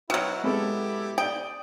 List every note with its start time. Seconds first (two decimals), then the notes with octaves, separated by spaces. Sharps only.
0.10 B2 F#3 E4 F#4 G5 F6
0.44 G#3 B3 E4 G4 A4
1.18 D5 G5 D#6